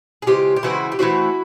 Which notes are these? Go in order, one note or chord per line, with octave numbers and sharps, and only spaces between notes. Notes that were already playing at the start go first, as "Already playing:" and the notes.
G#4
C#3 E3 G#3 C4 F4 G4
G4
C#3 E3 G#3 C4 E4 F#4
G4
E3 A3 C4 E4 F#4